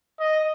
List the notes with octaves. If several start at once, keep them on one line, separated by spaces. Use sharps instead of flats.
D#5